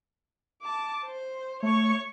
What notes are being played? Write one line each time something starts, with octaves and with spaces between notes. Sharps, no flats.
A5 D6
C5
A3 C#5 C#6